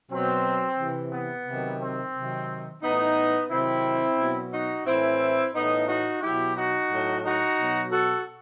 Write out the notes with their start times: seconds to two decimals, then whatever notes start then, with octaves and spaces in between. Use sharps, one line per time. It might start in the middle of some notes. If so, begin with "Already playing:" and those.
0.10 B2 F#3 C4
0.78 C3 E3
1.13 B3
1.47 C3 D#3 F#3
1.81 C4
2.14 C3 D#3 F#3
2.82 A2 E3 B3 D#4
3.50 C3 D#3 F#3 C4 E4
4.19 B2 F#3
4.52 D#4 F#4
4.86 A2 E3 C4 E4
5.54 A2 E3 B3 D#4
5.88 D#4 F#4
6.22 B2 F#3 E4 G4
6.56 D#4 F#4
6.90 A2 F#3
7.24 D#4 F#4
7.59 B2 F#3
7.91 F#4 A4